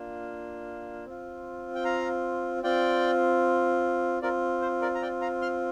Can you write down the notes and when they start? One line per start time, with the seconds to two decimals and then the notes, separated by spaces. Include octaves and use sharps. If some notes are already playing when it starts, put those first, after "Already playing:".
Already playing: A#3 D4 F4
1.05 C4 F4
1.75 G5
1.84 F5 A#5
2.63 C4 F4 D5 G5
4.22 C4 F4 A#4 D5
4.62 C5
4.81 A#4 D5
4.95 A#5
5.02 D5 G5
5.21 F5 A#5
5.41 C6 F6